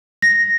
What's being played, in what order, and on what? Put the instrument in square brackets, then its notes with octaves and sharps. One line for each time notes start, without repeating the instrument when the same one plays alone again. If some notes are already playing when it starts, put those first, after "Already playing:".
[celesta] A#6